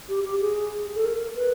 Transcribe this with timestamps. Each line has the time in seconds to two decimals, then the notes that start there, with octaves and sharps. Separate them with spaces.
0.09 G4
0.24 G4
0.40 G#4
0.96 A4
1.05 A#4
1.36 B4